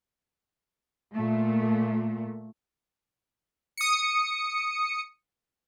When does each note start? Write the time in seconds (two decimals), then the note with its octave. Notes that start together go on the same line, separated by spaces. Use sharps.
1.15 A#2 A3
3.77 D#6 C#7